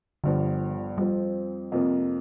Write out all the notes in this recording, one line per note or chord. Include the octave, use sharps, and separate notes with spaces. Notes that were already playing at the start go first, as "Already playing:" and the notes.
G1 G2 D3 F3
F2 F3 G3 C4
F2 C3 F3 A#3